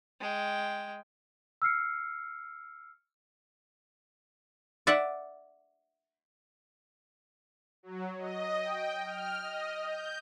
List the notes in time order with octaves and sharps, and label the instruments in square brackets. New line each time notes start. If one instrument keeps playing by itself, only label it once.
[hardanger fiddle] G#3 G5
[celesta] E6 F6 C7 C#7
[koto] D5 E5 F#5
[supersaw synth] F#3
D#5
G5
F6
D#5
G6